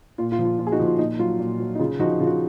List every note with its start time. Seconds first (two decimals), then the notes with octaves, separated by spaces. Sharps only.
0.18 A#2 F4
0.32 F4
0.39 F3
0.45 F4
0.59 A#2 F4
0.67 G#4
0.72 D#4 F#4
0.80 F3
0.86 F4
0.99 A#2 D#4
1.19 F#3 F4
1.39 A#2
1.60 F#3
1.75 D#4
1.79 C#3 F4
2.00 F3 D#4 F#4
2.20 C#3 F4
2.27 F#4